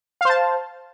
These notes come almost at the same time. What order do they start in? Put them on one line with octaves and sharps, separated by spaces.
F5 C5 A5